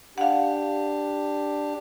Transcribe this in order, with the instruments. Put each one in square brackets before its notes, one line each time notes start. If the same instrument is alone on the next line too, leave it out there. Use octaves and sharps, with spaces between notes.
[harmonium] D4 G4 [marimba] F5 F#5